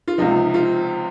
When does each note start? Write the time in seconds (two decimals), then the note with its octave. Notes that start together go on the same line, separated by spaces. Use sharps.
0.08 F4
0.18 C#2 C3 F3 D#4
0.54 F4